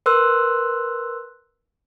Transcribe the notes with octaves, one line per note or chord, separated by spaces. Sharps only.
A#4 B4 C6 E6 F#6